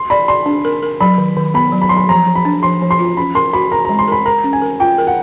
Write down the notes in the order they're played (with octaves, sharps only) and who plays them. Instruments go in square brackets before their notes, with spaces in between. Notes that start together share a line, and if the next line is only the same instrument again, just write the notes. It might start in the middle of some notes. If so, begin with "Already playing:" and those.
Already playing: [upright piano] C6
[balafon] D5 [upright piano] B5
[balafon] D5 [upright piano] C6
[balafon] D4
A#4
A#4
[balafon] F#3 [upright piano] B5
[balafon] D#3
D#3
[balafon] B3 [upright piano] B5
[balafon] F#3
[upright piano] B5
[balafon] F#3 [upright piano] C6
[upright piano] B5
[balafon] F3 [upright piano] A#5
[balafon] F3
[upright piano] B5
[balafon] D4
[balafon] F3 [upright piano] C6
[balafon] F3
[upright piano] C6
[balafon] F4
[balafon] C#4 [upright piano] B5
[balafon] A#4 [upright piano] C6
[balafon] F#4 [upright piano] B5
[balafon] A#4 [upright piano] A#5
[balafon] G#3 [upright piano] A#5
[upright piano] C6
[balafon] A#4 [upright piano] B5
[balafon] A#4 [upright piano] A#5
[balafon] C#4
[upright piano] G#5
[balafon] A#4
[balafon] F4 [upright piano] G5
[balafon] A#4
[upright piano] F#5